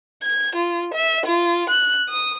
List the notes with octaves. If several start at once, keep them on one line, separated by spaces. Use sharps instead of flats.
G#6
F4
E5
F4
F#6
D#6